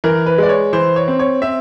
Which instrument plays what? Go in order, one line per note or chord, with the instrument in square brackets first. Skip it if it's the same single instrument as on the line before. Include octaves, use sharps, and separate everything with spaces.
[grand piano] E3 A#4
B4
G#3 D5
C#5
E3 C5
C#5
C4
C#5
C4 E5